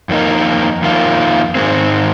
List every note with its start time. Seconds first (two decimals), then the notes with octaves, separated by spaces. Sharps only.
0.09 F2 D#3 A#3 D#4
0.82 F2 D#3 A#3 F4
1.55 G#2 D#3 G#3 C4